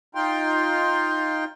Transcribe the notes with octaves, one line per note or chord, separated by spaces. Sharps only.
D#4 F4 G5 C6